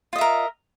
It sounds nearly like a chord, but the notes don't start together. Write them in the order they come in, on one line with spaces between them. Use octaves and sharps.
F4 D#5 E5 A#4